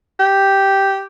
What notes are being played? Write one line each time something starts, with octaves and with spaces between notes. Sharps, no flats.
G4